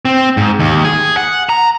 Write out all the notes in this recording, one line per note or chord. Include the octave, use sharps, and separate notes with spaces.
C4
G#2
D#2
G#4
F#5
A#5